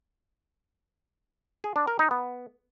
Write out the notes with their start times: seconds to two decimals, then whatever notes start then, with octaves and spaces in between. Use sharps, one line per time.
1.64 G#4
1.76 D4
1.87 A#4
1.99 D#4
2.11 B3